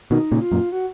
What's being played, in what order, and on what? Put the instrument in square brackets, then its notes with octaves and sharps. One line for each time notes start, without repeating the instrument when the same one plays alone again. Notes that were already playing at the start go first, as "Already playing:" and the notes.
[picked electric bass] B2 D#3 [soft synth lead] D#4
[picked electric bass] A#2 C#3
[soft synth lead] F4
[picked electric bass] F#2 A#2
[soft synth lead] F#4